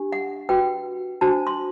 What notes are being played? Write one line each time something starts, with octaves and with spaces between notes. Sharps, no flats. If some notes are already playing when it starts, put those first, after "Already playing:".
Already playing: D4 G4
F#5
F#4 B4 G5
D4 F#4 C5 A5
C6